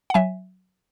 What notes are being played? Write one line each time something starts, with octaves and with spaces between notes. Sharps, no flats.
F#5
F#3 E5 G#5